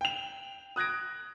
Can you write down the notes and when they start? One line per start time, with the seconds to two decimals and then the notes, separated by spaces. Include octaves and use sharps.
0.01 G5 F7
0.76 D#6 F#6 G#6 A#6 D7